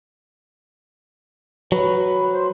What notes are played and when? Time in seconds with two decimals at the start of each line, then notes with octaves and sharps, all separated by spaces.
1.72 F#3 B4
2.33 C5